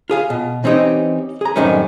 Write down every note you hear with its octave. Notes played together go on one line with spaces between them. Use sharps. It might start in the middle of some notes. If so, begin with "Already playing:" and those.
F4 G#4 F5
B2
E3 C4 C#4 D#4 G4
G#4 A#5
F#2 A2 D#3 G3 C4 C#4